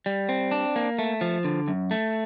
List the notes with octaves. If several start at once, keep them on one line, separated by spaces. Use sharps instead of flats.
G3
C4
D4
A#3
A3
F3
D3
F#2
A3